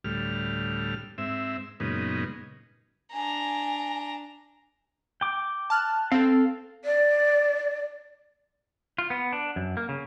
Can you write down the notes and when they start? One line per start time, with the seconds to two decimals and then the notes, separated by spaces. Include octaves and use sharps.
0.04 D2 A2 G3 F6
1.18 G#2 C4 E5
1.80 F#2 A#2 C#3 G#3 B3 D#4
3.14 D4 G#5 A#5
5.21 G5 D6
5.70 A5 F6 F#6
6.12 C4 A4 F5
6.85 D5
8.98 F4
9.10 B3
9.33 D4
9.56 F#2
9.77 A#3
9.89 C#3